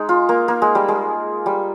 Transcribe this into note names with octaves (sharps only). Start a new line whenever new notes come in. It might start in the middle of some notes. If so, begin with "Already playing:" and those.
Already playing: G#3 D#4
F4
A#3
A#3
G#3
G3
G#3
G3